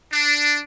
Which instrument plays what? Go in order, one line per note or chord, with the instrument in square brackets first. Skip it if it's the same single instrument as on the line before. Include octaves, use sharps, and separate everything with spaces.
[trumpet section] D4